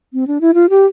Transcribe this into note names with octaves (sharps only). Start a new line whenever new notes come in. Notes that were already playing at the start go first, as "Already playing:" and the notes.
C4
D4
E4
F4
G4